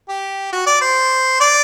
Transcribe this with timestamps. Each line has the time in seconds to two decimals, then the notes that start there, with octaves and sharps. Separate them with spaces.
0.09 G4
0.53 F#4
0.67 D5
0.81 C5
1.41 D5